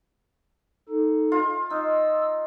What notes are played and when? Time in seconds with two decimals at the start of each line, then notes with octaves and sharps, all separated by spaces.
0.89 D#4 A4
1.32 F4
1.70 D#4 E6